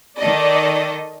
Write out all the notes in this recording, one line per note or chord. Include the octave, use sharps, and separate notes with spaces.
D#3 A4 D5 D#5